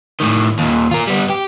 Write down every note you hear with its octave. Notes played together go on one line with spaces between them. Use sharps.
A2 D#3
D#2 A#2
F4 A#4
G3 B3
G4